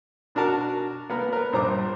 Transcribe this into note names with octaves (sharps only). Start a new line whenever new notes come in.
B2 D4 F#4 A#4 A5
A#3 B3 A#4
A#4 B4
A#1 G2 C5 A#5 D6